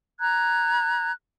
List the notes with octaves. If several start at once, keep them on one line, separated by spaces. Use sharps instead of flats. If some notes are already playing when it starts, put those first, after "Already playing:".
A#5 F#6 G#6